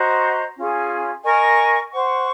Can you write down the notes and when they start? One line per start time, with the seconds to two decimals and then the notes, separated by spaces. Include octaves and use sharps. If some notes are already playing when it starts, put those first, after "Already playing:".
Already playing: F#4 C5 D#5 A#5
0.56 C#4 F4 G#4
1.24 A#4 D#5 G#5 C#6
1.91 C5 F#5 C#6